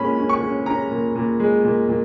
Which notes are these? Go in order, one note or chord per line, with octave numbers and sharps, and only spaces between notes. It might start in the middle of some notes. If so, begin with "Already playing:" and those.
Already playing: A#2 G#3 C#4 B5
C#4
C#6
C#4
C#4 A#5
A#2
A#2
G#3
A#2
A#2